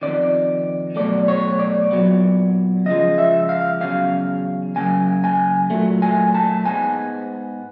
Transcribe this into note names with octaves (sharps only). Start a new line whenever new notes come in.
F2 C3 D#3 D5
B2 F#3 A3 D5
C#5
D5
A#2 F#3 B3
C#3 F3 G#3 D#5
E5
F5
E2 C#3 F#3 F5
C#3 F#3 A#3 G#5
G#5
A#2 F#3 A3
G#5
A5
G#2 E3 G#3 B3 G#5